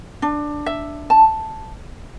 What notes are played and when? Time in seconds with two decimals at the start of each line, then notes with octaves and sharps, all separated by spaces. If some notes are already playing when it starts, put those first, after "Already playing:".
0.22 D4
0.66 E5
1.10 A5